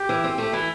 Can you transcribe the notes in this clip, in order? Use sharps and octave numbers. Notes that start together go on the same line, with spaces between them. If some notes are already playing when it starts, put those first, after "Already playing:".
Already playing: G4
E3
C4
A3 G4
E3 E4